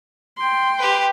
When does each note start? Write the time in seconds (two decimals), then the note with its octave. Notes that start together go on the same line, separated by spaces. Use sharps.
0.37 G5 C6
0.79 G4 B4